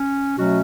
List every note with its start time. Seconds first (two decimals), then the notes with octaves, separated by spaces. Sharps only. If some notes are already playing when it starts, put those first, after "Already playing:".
Already playing: C#4
0.37 B2 F#3 A3 C#4 F#4